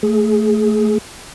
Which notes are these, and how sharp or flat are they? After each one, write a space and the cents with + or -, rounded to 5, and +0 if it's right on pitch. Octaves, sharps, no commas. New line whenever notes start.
A3 +0 G#4 +15